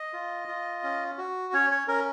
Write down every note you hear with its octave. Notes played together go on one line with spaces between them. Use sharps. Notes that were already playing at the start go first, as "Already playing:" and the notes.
Already playing: D#5
F4
F4
C#4
F#4
C#4 C#5
C#5
C#4 A#4